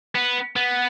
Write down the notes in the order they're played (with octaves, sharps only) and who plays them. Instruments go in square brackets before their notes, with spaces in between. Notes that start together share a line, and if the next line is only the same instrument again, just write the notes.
[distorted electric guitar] B3
B3